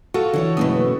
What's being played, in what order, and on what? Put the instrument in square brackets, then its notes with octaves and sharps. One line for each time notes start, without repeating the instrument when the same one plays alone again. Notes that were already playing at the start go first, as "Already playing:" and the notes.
[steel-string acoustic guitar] F4 [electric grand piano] F#4 A4
[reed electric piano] D3 E3 [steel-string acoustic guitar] E4 C5 C#5
[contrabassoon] F#1 [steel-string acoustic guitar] B2 E3 A3 [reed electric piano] D#6